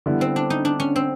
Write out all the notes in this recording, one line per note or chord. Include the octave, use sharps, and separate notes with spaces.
D3 G3 B3 E4
C4
D4
D#4
D4
C#4
C4